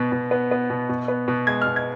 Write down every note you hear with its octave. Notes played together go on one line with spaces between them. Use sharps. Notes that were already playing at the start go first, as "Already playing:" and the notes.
Already playing: B2 B3
B2
B3
B3
B2
B2
B3
B2
G#3 G#6
B2 F6
G#6